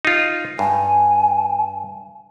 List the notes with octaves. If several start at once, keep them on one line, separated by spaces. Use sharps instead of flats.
D#4 F4
G2 G#5